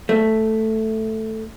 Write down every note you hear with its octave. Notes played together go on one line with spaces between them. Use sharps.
A3